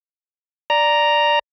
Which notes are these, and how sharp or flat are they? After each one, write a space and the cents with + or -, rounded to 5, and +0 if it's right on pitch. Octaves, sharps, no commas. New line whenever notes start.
D5 +0 A#5 +0